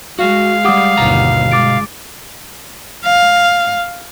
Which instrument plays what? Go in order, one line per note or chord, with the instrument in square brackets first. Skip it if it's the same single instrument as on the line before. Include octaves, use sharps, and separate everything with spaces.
[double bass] G#3 [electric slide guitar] F#4 [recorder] F5
[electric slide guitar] G3 G4 [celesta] F#5 D6 D#6
[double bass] G1 D#2 [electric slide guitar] B2 A#5
[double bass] G#3 [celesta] D6 A6 D7
[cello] F5